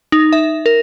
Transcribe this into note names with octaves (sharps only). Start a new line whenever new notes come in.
D#4
E5
A#4